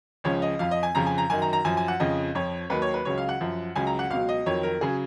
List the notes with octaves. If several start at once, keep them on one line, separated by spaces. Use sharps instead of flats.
C#2 C#3 F3 C#5
D#5
F2 F3 F5
D#5
G#5
F2 C#3 F3 A#5
G#5
A#5
F#2 D#3 F#3 G#5
A#5
A#5
F#2 F3 G#5
G#5
F#5
F2 C#3 F3 D#5
F2 F3 C#5
D#2 D#3 F#3 B4
C#5
B4
C#2 C#3 F#3 C#5
F5
F#5
F#2 F3
C#2 C#3 F#3 G#5
A#5
F#5
C#2 B2 F#3 F5
D#5
F2 D#3 F#3 C#5
A#4
C#3 F#3 G#4